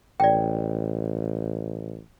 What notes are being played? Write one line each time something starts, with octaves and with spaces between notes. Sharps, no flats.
A1 D5 G5